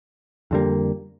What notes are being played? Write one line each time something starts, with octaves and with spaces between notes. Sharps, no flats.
F2 D3 G3 A#3